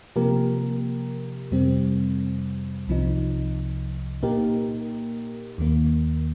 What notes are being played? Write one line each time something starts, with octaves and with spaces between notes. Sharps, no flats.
C3 F3 A#3 G4 A#4
F2 C3 G3 C4
C2 C3 F3 D#4
A#2 A#3 D#4 G4 A#4
D#2 D#3 A#3